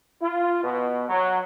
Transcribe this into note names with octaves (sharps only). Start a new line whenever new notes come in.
F4
B2
F#3